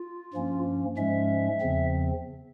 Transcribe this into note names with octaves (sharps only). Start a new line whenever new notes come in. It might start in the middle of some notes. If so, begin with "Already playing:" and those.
Already playing: F4
G2 F3 A#3 C#4
G#2 F3 G#3 C#4 E5
E2 C#3 F3 C4